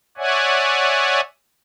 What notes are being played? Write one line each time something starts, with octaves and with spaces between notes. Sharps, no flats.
C#5 D5 E5 F#5 G#5